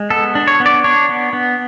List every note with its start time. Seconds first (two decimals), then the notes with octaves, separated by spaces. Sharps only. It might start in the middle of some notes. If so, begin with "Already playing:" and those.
Already playing: G#3
0.10 B3 A4
0.35 D4
0.47 C#5
0.60 B3
0.66 D5
0.84 D4 C#5
1.09 B3
1.33 B3